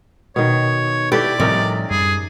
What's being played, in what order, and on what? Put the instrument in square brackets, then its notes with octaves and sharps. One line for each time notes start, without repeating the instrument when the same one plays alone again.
[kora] B2 D#3 [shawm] C#5
[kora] E4 A4 B4 [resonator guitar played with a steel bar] G4 [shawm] D5
[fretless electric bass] A2 F3 G3 [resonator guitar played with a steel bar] C3 [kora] C#4 D#4 A#4
[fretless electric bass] F#2 G3 [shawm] G#4